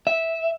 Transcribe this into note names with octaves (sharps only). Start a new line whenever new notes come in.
E5